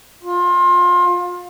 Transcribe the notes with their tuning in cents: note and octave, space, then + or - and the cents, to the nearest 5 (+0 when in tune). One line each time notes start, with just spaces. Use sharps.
F4 +25